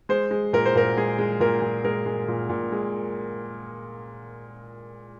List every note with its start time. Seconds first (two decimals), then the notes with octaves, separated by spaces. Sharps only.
0.09 G#3 C5
0.31 G#3
0.53 A#2 A#4
0.65 C5
0.75 A#2 A#4
0.97 G#3 G#4
1.19 G#3
1.40 A#2 A#4
1.62 A#2
1.84 G#3 A#4
2.06 G#3
2.28 A#2
2.49 A#2
2.72 G#3